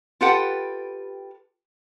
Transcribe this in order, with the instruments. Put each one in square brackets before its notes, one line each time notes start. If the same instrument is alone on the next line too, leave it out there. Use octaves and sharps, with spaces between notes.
[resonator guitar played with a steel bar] F4 G4 A4 B4 F#5 G5